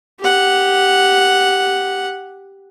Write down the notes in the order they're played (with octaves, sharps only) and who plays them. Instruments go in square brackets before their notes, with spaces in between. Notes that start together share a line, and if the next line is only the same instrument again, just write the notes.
[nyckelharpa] G4 F#5